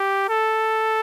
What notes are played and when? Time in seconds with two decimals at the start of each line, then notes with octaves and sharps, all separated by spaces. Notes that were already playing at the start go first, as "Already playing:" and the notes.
Already playing: G4
0.29 A4